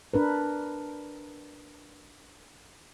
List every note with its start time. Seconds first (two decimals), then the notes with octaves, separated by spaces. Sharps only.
0.14 D4 A#4 B4